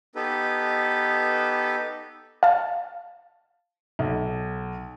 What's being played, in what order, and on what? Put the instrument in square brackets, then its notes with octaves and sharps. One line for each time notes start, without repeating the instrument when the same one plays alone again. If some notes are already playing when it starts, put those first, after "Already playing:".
[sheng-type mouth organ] B3 D#4 G4 A4 B4
[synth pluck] F5 A5
[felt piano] B1